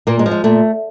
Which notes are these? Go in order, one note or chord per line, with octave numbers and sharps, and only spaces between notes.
A#2 A#3
G#3
F3
G#3
A#2 A3